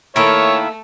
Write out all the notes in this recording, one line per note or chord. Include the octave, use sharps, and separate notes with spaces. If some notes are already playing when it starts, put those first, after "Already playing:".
D#3 A3 A#3 E4 C#5 E5